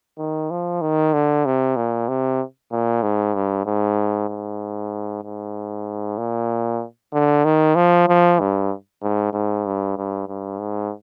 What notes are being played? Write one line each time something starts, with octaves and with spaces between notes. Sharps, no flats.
D#3
F3
D#3
D3
C3
A#2
C3
A#2
G#2
G2
G#2
G#2
G#2
A#2
D3
D#3
F3
F3
G2
G#2
G#2
G2
G2
G2
G#2